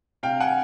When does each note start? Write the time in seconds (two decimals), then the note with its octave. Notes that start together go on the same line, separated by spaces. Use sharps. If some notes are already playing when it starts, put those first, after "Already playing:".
0.23 C3 F5 G5
0.40 F#5 G#5